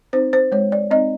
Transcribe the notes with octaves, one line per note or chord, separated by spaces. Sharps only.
C4 D#4 C5
C5
G#3 C#5
D5
C4 D#4 D#5